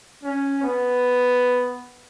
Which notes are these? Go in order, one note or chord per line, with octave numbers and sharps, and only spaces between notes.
C#4
B3